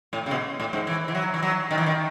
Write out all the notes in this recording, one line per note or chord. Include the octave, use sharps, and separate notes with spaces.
A2
C#3
B2
A2
G#2
E3
E3
F#3
E3
F#3
D#3
E3
D#3